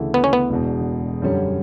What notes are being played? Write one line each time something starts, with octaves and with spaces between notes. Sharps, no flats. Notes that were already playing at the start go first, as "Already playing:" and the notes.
Already playing: D2 C#3 E3 A3 E4
B3
C#4
B3
E1 E2 B2
F#2 D3 G3 C#4